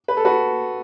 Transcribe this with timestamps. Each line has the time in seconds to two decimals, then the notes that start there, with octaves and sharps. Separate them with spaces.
0.08 B4
0.17 A4
0.25 F#4 B4